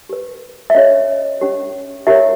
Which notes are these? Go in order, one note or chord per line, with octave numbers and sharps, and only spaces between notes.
G4 B4
E5
C#4 G4 C#5 D#5
C#4 G4 C#5
E4 G4 A#4 C#5 E5